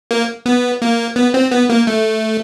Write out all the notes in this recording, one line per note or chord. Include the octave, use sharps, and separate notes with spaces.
A#3
B3
A#3
B3
C4
B3
A#3
A3